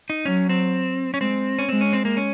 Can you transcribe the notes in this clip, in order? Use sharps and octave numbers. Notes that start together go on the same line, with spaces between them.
D#4
F#3 C#4
C4
C#4
G#3 C4
C#4
G#3 C4
C#4
C4
A#3
C#4